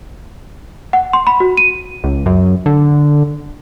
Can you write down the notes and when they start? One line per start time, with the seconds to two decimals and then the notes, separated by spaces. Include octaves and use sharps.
0.93 F#5
1.13 C6
1.27 B5
1.40 F#4
1.57 D#7
2.04 C#2
2.26 F#2
2.66 D3